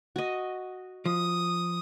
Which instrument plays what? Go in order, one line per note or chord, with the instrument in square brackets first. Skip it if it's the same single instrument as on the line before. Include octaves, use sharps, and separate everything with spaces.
[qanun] F#4 D#5
[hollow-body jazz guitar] F3 [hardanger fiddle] D#6